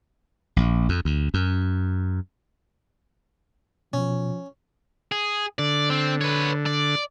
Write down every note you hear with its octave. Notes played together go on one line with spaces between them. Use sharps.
A#1
F2
D2
F#2
B2 F3 C#4
G#4
D3 D5
C4
B4 C#5
D5